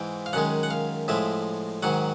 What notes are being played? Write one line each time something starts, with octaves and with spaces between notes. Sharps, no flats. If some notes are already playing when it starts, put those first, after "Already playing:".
Already playing: G#2 E3 G#3 G5
F5
F#2 D#3 G#3 F#5
F#5
F5
A2 F3 G#3 E5
G#2 D#3 F#3 F#5